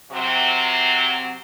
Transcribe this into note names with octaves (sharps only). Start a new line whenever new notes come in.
C3 F#3 C4